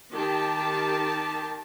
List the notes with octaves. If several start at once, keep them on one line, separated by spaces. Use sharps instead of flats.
D#3 G4 A5